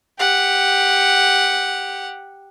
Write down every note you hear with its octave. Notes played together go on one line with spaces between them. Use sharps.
G4 F#5